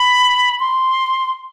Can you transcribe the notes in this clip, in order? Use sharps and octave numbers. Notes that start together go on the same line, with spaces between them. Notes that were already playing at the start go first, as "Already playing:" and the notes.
Already playing: B5
C6